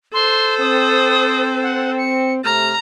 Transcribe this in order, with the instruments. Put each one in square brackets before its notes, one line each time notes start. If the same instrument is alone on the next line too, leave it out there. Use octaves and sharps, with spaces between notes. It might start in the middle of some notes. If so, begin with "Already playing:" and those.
[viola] A4 C5 [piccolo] C6
[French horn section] C4 [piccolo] D#6
[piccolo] F#5
C#7
[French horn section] C3 A3 [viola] A#5 [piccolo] F6